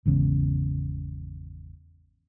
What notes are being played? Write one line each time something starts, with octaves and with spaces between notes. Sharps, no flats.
G#1 E2 C#3